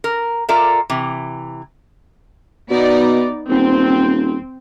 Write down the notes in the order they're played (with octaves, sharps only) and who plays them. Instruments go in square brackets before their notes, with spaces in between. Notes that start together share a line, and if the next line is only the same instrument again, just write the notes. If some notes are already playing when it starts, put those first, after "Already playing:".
[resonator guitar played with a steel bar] A#4
F4 A4 A#4 D5 E5
C3 E3
[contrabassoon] B2 [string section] B3 D#4 D5
[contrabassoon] D#1 [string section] C4